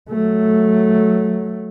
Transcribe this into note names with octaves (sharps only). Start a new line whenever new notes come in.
F#3 A3